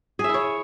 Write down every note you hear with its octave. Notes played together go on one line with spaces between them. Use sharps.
E4 G#4 C#5 E5